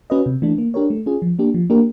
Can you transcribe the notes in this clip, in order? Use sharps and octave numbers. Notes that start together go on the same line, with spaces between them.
C#4 F#4 B4 D#5
C3
E3 A3 D4
A#3
D4 G4 A#4 C#5
A3
C#4 F4 G#4
F3
A#3 D4 G4
F3
A#3 D4 G4 A#4